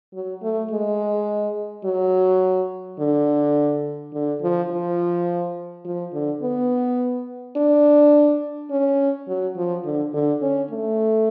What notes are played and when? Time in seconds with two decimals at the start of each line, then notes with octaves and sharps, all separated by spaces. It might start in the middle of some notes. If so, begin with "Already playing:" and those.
0.14 F#3
0.42 A3
0.71 G#3
1.85 F#3
2.99 D3
4.13 D3
4.42 F3
4.71 F3
5.85 F3
6.13 D3
6.42 B3
7.57 D4
8.70 C#4
9.28 F#3
9.56 F3
9.85 D3
10.14 D3
10.42 C#4
10.71 A3